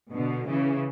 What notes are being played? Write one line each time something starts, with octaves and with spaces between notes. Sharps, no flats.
B2 D3
C#3 E3